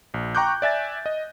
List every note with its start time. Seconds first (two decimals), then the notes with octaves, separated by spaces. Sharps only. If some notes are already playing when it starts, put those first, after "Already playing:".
0.14 A#1
0.35 G5 A#5 C#6 D6 F#6 G6
0.62 D5 E5 G#5 A6
1.06 D#5